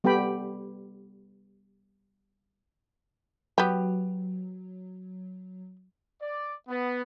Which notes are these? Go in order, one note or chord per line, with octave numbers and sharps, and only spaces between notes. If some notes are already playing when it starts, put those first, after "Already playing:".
G3 B3 G4 A4 G5 B5
F#3 B3 G4
D5
B3